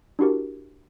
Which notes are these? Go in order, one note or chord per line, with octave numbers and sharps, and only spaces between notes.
D4 E4 F#4 G4 A#4